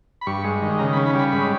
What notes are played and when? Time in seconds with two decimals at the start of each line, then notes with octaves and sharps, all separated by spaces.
0.21 B5
0.27 G2 C#6
0.44 G#3
0.62 D#3
0.79 C#3 A#5
0.93 B5
0.97 C#4
1.06 B5
1.14 G3
1.19 B5
1.32 G#2 B5